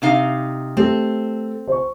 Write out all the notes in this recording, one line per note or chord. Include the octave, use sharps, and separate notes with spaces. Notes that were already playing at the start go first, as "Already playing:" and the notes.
C3 D#4 F5
A3 C4 G4 A4
C5 C#6